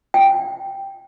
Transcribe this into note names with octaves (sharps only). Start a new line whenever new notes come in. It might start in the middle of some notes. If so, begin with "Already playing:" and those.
G5